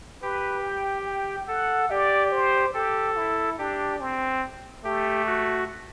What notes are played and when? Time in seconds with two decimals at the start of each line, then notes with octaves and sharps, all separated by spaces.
0.22 G4 B4
0.63 G5
1.06 G5
1.48 A4 F#5
1.90 G4 D5
2.32 C5
2.74 G4 A4
3.17 E4
3.58 D4 G4
4.01 C4
4.85 A3 G4
5.26 F#4